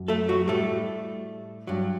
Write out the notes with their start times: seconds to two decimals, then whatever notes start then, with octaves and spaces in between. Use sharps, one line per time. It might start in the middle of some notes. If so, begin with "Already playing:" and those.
Already playing: F#2
0.08 A3 A4
0.29 F#3 F#4
0.48 A2 G3 A3 A4
1.67 G2 F#3